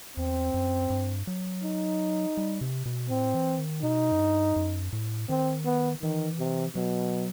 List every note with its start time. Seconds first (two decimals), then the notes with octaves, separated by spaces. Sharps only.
0.17 E2 C4
0.54 F#2
0.90 G2
1.27 F#3
1.64 D#4
2.37 G3
2.61 C3
2.86 B2
3.10 A2 C4
3.34 E3
3.59 D#3
3.83 B2 D#4
4.12 F#2
4.20 G2
4.56 F#2
4.93 A2
5.29 D#3 C4
5.65 B3
6.02 D#3 E3
6.39 C3
6.75 B2 F#3